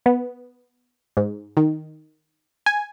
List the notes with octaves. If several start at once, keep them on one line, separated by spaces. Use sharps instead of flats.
B3
G#2
D#3
G#5